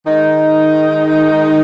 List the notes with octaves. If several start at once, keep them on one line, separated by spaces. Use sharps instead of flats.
D#3 G#3 D#4